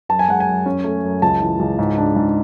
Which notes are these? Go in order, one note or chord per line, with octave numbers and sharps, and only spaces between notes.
F#2 A5
G#5
G#3 F#5
G#5
F#2
C#4
A3
F#2
C#2 A5
E3
C#2
G#2
D4
G#2